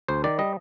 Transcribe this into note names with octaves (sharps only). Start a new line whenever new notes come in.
D2 C5
D#3 D5
G3 D#5